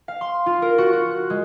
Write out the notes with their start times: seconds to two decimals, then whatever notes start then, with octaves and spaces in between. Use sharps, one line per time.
0.08 F5
0.21 C6
0.46 F4
0.62 A#4
0.78 F#4
0.93 F#4
1.10 F#6
1.30 G#3